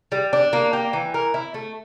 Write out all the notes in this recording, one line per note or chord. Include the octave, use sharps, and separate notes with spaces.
G3
D4
A#3
G4
E3
A#4
E4
A3